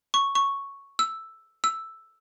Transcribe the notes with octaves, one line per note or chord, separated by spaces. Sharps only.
C#6
C#6
E6
E6